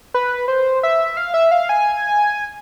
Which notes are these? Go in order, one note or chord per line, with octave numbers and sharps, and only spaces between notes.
B4
C5
E5
F5
E5
F5
G#5